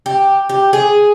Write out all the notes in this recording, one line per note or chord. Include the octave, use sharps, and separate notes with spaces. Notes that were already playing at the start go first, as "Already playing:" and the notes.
G4
G4
G#4